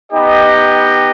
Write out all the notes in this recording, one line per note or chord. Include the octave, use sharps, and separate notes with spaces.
B3 D#4 G4 D#5 G5